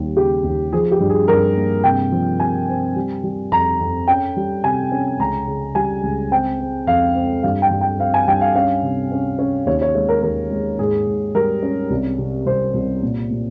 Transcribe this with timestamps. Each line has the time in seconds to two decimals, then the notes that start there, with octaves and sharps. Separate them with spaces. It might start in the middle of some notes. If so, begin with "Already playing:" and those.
Already playing: D#2 G3
0.17 C#3 G4
0.44 D#2
0.73 F3 G#4
0.92 G4
1.00 G2
1.10 G#4
1.28 G2 A#4
1.57 A#3
1.84 C3 G5
2.12 F3
2.40 C3 G#5
2.69 C4
2.96 G3
3.24 G3
3.52 F2 A#5
3.80 F2
4.08 C#4 G5
4.37 G3
4.64 C3 G#5
4.92 C#4
5.19 C#2 A#5
5.47 C#3
5.75 G3 G#5
6.03 C#2
6.31 C4 G5
6.60 C4
6.87 F2 F5
7.15 C4
7.43 G2 F5
7.62 G5
7.71 G2
7.81 G5
7.99 C4 F5
8.14 G#5
8.27 G2 G5
8.41 F5
8.55 C#4 F5
8.83 C3
9.12 C#4
9.39 C#4
9.66 D#2 C#5
9.82 C#5
9.95 G#3 C#5
10.09 A#4
10.22 D#2 A#4
10.51 G#3
10.79 G#2 G#4
11.07 G#2
11.35 G3 A#4
11.63 C#4
11.90 C2
12.18 C3
12.46 C2 C5
12.74 C2
13.03 A#2
13.31 A#2